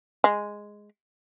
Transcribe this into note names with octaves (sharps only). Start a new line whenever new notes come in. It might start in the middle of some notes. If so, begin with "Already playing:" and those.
G#3